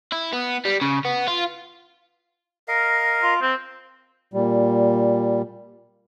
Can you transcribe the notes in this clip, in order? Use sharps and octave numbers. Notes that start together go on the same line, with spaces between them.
E4
B3
G3
C#3
B3
F4
A#4 D#5 F5
F4
C4
A#2 G3